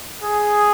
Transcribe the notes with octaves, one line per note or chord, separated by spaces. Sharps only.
G#4